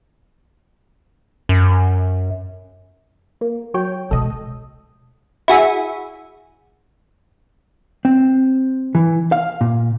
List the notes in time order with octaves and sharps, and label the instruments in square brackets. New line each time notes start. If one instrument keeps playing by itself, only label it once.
[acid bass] F#2
[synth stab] A#3
F#3 C#5 G5
[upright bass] B2 G#3 [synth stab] A4 D#5
[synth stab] E4 F#4 G#4 E5
[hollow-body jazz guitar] C4
E3
F5
A#2